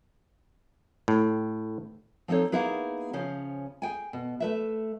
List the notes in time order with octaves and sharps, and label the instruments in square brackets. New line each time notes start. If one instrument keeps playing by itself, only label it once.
[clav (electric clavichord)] A2
[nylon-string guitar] F3 C4 D#4 A4 C#5
A#3 B3 D#4 E4 G#4 B4
C#3 F3 C#4 C5
G#4 G5 G#5
B2
A3 B4 E5